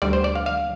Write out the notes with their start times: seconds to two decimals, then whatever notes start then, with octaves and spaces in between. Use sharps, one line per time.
0.02 D2 D3 G3 D5
0.13 C5
0.24 D5
0.35 F5
0.46 F5